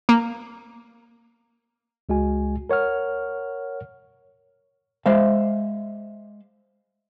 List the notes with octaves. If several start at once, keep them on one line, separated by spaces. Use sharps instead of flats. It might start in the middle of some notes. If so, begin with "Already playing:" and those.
A#3
C#2 G#3 F#4 G#5
A#4 C#5 F#5 F6
G#3 C5 E5 F5